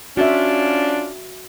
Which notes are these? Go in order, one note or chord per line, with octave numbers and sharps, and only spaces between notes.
C#4 D4 F4 F#4 E5